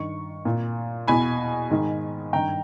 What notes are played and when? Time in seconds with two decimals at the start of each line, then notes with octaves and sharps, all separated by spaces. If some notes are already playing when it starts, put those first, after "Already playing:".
Already playing: G2 D#3 C#6
0.45 A#2
1.08 E2 B2 G#5 B5
1.70 G#2 D#3
2.33 G2 D#3 G5 A#5